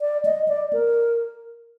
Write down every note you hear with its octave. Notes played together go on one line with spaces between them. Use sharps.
D5
D#5
D5
A#4